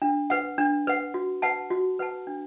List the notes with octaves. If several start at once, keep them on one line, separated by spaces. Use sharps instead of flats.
D4
B4 F#5
D4
B4 F#5
F#4
B4 F#5 A5
F#4
B4 F#5 A5
D4